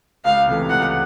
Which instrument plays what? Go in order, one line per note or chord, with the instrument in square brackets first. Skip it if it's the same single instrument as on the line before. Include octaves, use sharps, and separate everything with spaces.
[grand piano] C#2 [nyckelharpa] F5
[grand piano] C3 E3 A3
[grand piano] C#2 [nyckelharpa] F#5